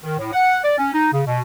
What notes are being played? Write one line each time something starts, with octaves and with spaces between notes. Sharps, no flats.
D#3
A2
F#5
D5
C#4
D#4
C#3
B2